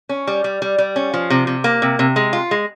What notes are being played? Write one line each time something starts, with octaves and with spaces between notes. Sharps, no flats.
C#4
G3
G3
G3
G3
C#4
F3
C3
C3
A#3
C3
C3
G#3
F4
G#3